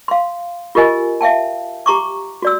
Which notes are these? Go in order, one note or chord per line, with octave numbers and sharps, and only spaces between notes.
F5 C6
F4 G4 A#4 D#5 G#5
E5 F5 G5 A5
G4 A#5 C#6 D6
F#4 D5 E6